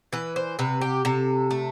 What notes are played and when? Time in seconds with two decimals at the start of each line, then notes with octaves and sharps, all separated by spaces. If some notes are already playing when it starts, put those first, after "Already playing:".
0.13 E3 B4
0.36 C5
0.59 C3 B4
0.81 G4
1.05 C3 A4
1.51 A3